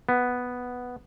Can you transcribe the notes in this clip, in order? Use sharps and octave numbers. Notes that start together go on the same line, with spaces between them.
B3